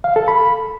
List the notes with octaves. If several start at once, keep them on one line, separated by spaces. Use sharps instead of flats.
F5
A4
B5